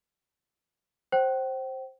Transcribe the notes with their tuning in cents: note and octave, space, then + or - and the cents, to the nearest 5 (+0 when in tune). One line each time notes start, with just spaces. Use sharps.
C5 +15 G5 -40